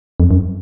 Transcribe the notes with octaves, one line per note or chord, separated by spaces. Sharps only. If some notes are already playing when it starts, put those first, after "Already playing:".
F2
F#2